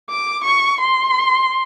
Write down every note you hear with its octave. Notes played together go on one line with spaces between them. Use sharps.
D6
C#6
C6